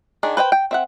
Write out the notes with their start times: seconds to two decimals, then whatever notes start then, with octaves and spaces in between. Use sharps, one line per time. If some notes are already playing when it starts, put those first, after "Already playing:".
0.23 D#3 D4 G#4
0.37 B4 C5 D#5 G5
0.52 G5
0.71 C4 E5 F#5